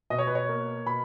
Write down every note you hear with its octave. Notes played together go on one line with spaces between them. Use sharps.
B2 D#5
C#5
B4
C#5
A#3
B2 B5